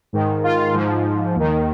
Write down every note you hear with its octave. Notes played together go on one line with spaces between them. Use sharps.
G#2 D#3
F4
G#2 F3
D#2 D#3